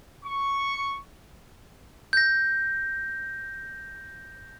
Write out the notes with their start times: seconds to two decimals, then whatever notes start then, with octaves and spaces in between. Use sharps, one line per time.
0.24 C#6
2.13 G6 A#6